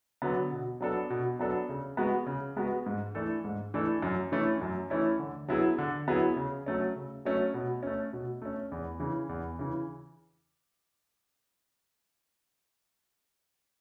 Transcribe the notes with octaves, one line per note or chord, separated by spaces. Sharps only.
D3 F#3 B3
B2
F#3 B3 D4 A4
B2
F#3 B3 D4 A4
C#3
G#3 B3 F#4 B4
C#3
G#3 B3 F#4 B4
G#2
E3 A3 D4 A4
G#2
E3 A3 D4 A4
F#2
E3 A3 C#4 E4
F#2
E3 A3 C#4 E4
D3
F#3 B3 E4 G#4
D3
F#3 B3 E4 G#4
C#3
F#3 A3 C#4
C#3
F#3 A3 C#4
B2
A3 C#4
B2
A3 C#4
E2
C#3 E3
E2
C#3 E3